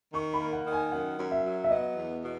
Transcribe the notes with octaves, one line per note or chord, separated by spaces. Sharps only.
D#3 C#6
B5
A#3
F#5
D#3
G#5
F#2 F#5
F#2
E5
F#3
E5
B3 D#5
E2
B2